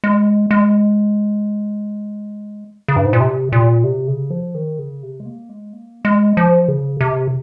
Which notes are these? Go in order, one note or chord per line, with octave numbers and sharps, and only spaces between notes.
G#3
G#3
C#3
G2
G#2
A#2
C3
A#2
C3
C#3
F3
D#3
C#3
C3
G#3
A#3
G#3
A#3
G#3
F3
C#3
C3